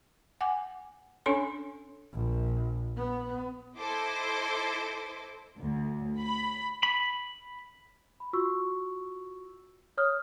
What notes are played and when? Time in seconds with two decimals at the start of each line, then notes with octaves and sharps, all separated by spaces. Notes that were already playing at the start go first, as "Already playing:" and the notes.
0.41 F#5 G#5 D6
1.26 C#4 D4 A4 C#5 G#5 C6
2.13 A#1
2.97 B3
3.78 E4 A4 C5 D#5 C6 D6
5.59 D2
6.19 B5
6.83 B5
8.20 B5
8.33 F4 F#4 C#6 E6
9.98 C#5 D#6 F6